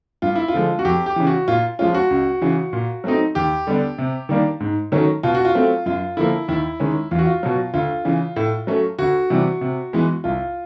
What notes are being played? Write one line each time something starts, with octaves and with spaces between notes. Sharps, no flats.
G2 F4
E4
F4
D3 F3 G#3
F#4
F2 G4
G4
C#3 E3
F#4
A#2 F4
F3 G#3 C#4 F4
F#4
C#2
C#3 E3
A#2
F#3 A3 C4 D#4
D#2 G4
D3 G3 B3 D4
C3
D#3 G3 A#3 D4
G#2
D#3 F#3 A3 C#4
B2 F4
F#4
F4
F#3 A3 C4
F#2 F4
D3 F3 A#3 E4
D#2 E4
D#3 G#3 C#4
E2 F4
F#4
F4
B2 F#3
D2 F4
C#3 E3
A2
F#3 A3 C#4
D2 F#4
C3 E3 G3
C3
E3 G#3 B3
C2 F4